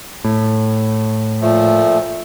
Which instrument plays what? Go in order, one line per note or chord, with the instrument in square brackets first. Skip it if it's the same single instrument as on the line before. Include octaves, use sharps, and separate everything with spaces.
[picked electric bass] A2
[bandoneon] A#2 F3 A3